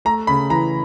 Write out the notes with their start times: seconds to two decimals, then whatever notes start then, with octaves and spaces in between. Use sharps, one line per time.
0.05 A3 A#5
0.27 C#3 B5
0.50 E3 A#5